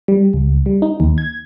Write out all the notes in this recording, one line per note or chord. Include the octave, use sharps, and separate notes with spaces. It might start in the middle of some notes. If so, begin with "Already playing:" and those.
G3
C#2
G3
D#4
D#2
G#6